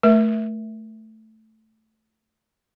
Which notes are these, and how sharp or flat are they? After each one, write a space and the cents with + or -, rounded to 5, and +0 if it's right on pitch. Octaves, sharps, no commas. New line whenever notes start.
A3 +0 A#4 +30 E5 +0